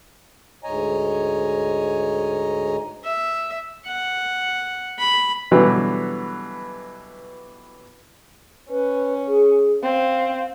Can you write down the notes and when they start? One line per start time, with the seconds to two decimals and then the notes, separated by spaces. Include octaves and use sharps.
0.64 D2 G#2 C#5 D#5 G#5 A#5
3.04 E5
3.86 F#5
4.99 B5
5.52 B2 D3 E3 F#3 G3
8.70 C#4 B4
9.27 G#4
9.83 C4 F5